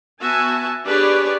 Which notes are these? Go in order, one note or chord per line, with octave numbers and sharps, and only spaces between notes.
B3 F#4 E5 G#5 A5
D4 G4 G#4 B4 C#5 D5